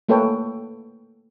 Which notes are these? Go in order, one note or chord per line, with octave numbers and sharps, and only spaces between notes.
A3 A#3 A4 B4 C#5 G5